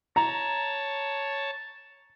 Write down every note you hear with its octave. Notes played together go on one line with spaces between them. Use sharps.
C#5 A5 A#5